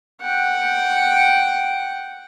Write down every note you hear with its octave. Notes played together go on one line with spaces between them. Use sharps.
F#5 G5